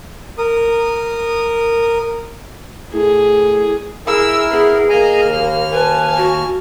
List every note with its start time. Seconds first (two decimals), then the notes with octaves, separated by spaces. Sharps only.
0.38 A#4 D#6
2.93 A2 G#4
4.07 E4 G#4 A#4 E6
4.51 B3 G#4
4.89 A#3 D#5 G#5 A#5
5.22 D#2 F6
5.73 B4 G#5 A5
6.17 F#4